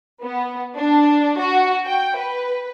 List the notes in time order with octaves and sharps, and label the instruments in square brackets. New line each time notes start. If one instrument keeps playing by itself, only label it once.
[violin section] B3
D4
F#4
G5
B4